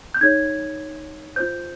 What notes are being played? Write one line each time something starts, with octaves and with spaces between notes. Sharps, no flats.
G6
D#4 G#4 C#5 G#6
F4 C5 G6